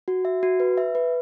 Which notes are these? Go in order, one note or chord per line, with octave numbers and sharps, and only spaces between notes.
F#4
E5
F#4
B4
E5
B4